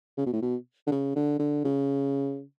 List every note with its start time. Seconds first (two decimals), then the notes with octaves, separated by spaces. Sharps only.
0.18 C#3
0.26 B2
0.33 A2
0.42 B2
0.87 D3
0.91 C#3
1.16 D3
1.39 D3
1.64 C#3